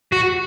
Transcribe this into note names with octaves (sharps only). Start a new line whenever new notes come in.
F#4